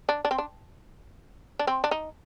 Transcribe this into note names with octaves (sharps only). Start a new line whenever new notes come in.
D4
D4
C4
D4
D4
C4
D4
D#4